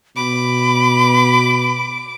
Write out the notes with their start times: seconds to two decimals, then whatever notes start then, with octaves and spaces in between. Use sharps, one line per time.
0.17 B2 B5 D6